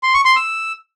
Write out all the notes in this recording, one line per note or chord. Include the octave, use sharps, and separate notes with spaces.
C6
C#6
C6
E6